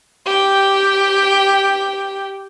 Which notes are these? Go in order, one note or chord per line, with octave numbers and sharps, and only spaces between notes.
G4 G5